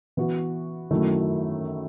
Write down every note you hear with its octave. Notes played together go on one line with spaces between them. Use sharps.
E3 B3 F#4
F#2 D#3 F#3 A3 E4